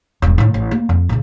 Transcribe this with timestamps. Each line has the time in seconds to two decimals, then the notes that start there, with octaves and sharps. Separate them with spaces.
0.22 E1 G2
0.38 A2 D#3
0.54 A1
0.71 A#3
0.89 F2
1.09 A#2 C#3